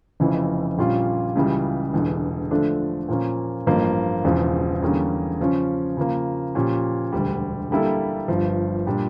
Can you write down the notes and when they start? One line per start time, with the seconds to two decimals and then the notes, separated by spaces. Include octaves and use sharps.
0.20 F1 F2 C#3 E3
0.78 A#1 A#2 G3 C#4 F4
1.35 C#2 C#3 E3 G3
1.93 E1 E2 D3
2.51 D3 F3 A3 D4
3.08 A#2 F3 A#3 C#4
3.66 A1 G2 F3 A#3
4.24 E1 E2 C#3 F3
4.82 E2 D3 G3 A#3 C#4
5.40 C#3 F3 C#4
5.97 C#3 F3 A#3
6.55 A#2 F3 C#4 G4
7.12 E1 D2 D3 G3
7.70 D3 G3 A#3 E4 A4
8.28 G1 G2 F3
8.86 A#2 G3 D4